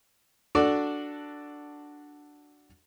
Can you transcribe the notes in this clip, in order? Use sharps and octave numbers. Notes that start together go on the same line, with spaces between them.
D4 F#4 A4 D5